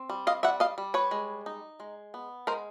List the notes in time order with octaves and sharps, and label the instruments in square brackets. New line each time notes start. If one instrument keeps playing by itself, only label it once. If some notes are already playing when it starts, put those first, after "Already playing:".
Already playing: [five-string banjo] C4
G3
D#5 F5
G3 E5 F#5
D#5 F5
G3
B4 C#5
G#3
D#4
G#3
B3
G#3 A#4 C5